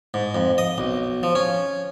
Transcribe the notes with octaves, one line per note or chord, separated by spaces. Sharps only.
G#2
F2
D#5
B1
F3
C#4